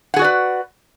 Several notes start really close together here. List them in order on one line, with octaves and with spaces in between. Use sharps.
F#5 G#4 F#4 D5 B4